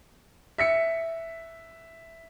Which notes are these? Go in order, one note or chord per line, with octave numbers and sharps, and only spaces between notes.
E5 B6 C#7